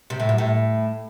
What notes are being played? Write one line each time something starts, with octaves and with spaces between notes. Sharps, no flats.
C3
A2
F#2
A2